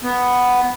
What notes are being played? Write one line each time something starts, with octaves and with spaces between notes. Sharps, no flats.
B3